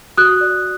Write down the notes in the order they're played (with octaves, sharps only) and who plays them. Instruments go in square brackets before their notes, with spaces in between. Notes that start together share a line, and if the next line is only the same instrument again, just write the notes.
[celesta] F#4 D#6 F#6
D5